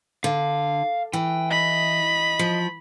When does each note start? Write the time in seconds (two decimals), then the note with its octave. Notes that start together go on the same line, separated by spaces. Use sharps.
0.24 D3 F5
1.13 E3 G5
1.51 D#5 B5
2.39 F3